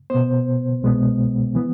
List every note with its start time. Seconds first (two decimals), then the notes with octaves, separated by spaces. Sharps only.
0.10 B2 B3 C5
0.82 C2 B2 G#3 B3
1.55 E3 B3